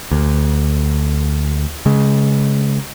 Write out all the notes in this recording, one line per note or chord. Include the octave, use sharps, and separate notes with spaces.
D2
C#3 G#3